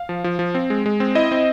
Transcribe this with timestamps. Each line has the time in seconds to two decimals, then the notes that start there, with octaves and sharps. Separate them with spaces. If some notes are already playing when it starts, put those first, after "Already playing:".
Already playing: F5
0.09 F3
0.24 F3
0.39 F3
0.55 C4
0.70 G#3
0.86 G#3
1.00 C4
1.15 E4 D#5
1.31 C4